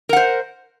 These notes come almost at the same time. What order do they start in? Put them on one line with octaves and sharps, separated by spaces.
A#4 F#5 C5